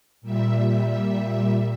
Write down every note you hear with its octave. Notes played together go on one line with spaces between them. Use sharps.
A#2 G3 E5